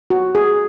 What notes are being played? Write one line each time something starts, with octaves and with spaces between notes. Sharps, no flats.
F#4
G#4